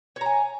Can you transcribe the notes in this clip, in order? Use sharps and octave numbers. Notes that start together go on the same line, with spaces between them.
C#5 G#5 A#5